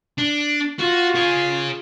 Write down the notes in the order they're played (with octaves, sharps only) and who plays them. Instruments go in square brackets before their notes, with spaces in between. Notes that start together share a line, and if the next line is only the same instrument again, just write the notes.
[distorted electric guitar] D4
[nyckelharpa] F4 [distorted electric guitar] F#4
[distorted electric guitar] G#4 C#5